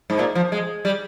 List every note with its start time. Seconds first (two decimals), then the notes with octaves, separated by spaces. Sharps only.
0.10 G#2
0.19 A#2
0.35 F3
0.52 G#3
0.85 G3